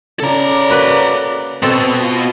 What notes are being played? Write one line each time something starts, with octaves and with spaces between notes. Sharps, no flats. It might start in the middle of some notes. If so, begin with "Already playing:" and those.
C#3 A4 D5 A#5
A#3 F#4 B4
B2 B3 C4 F#4 A4
F4